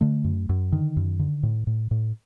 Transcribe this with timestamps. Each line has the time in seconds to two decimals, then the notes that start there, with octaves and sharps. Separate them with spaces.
0.01 D3 A3
0.24 F#2
0.49 F#2
0.72 D3 D#3
0.96 F#2
1.19 D3
1.43 A2
1.67 A2
1.91 A2